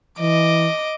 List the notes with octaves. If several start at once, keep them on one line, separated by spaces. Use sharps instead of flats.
E3 D#5 D6